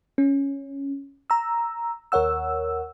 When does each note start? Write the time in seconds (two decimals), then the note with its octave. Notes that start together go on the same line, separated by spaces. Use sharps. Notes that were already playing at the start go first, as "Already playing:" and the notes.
0.18 C#4
1.30 A#5 E6
2.12 D#2 A#4 C#5 F#5 E6